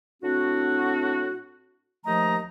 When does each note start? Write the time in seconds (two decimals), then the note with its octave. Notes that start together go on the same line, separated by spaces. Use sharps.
0.22 A2 C4 D4 F#4
2.05 D#2 F3 A3 D#4 D#5 A#5